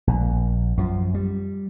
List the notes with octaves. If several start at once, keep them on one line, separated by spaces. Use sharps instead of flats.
A#1
F#2 F3
G3